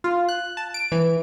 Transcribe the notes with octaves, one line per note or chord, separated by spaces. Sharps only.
F4
F#6
A5
D7
E3